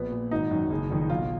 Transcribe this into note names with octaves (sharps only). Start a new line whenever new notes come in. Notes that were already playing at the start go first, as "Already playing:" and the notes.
Already playing: A#1 B3
A#2
G#1 D#4
F#2 D#3
F#1
F2 D#3
B1 F4